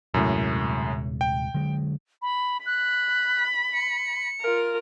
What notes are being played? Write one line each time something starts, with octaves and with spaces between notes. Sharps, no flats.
D#1 F#2 A2 C3 G#3
G5
D3 F#3 G#3
B5
B5 F#6
C#7
F4 A#4